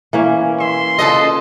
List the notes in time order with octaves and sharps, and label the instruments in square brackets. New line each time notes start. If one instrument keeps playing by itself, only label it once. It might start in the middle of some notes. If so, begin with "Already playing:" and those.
[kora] E3 A#3 C#4
[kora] E5 [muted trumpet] C6
[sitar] C#3 A4 D#5 [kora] F4